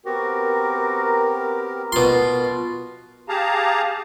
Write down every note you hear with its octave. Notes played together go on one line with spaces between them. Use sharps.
B3 C4 F#4 G4 A#4
B2 D#3 F4 C6
G4 G#4 F5 A5 A#5